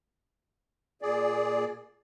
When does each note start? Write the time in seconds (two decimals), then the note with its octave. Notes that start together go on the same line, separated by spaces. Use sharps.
1.02 A#2 G#4 D5